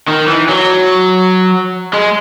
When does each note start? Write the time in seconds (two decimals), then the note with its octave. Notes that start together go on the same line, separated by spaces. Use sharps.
0.08 D#3
0.28 E3
0.49 F#3
1.94 G#3